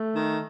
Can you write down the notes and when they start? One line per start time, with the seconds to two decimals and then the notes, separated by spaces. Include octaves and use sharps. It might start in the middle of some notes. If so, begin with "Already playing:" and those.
Already playing: A3
0.14 D#3